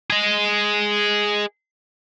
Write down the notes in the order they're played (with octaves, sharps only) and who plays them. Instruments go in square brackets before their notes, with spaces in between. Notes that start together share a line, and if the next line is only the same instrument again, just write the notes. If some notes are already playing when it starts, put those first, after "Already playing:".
[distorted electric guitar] G#4 D#5